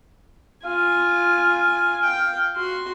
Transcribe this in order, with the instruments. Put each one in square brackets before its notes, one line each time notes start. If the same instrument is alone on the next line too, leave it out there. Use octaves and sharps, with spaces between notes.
[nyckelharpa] F4 G#5 [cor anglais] F5
[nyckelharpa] G5
F#4 C6